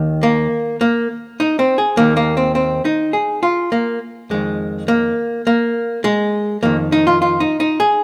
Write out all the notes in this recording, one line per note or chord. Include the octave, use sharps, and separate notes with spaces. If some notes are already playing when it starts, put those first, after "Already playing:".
Already playing: D#2 D#3
A#3
A#3
D#4
C4
G#4
D#2 D#3 A#3
A#3
C4
C4
D#4
G#4
F4
A#3
F2 D#3 G#3
A#3
A#3
G#3
F2 D#3 A#3
D#4
F4
F4
D#4
D#4
G#4